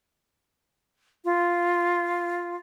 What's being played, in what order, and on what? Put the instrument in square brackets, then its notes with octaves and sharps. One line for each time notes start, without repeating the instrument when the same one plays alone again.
[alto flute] F4